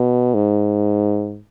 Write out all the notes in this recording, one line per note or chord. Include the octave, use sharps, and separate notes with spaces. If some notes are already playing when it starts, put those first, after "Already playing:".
Already playing: B2
G#2